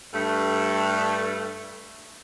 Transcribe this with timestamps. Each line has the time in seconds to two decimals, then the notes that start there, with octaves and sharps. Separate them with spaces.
0.14 G2 A3